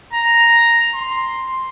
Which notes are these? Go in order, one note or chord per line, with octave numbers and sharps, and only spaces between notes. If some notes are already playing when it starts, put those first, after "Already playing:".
A#5
C6